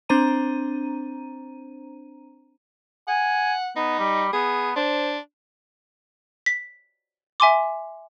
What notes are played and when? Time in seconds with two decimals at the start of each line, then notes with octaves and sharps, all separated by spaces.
0.09 C4 D4 C5 A#5 D#7
3.08 F#5 G#5
3.76 B3 D#4
3.99 G3
4.33 B3 G#4
4.76 D4 C5
6.46 B6
7.40 E5 G#5 C6 D6